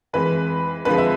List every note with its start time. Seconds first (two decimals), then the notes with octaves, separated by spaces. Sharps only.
0.13 F2 E3 G#3 B4
0.85 F2 D3 F3 G#3 B4
0.98 E5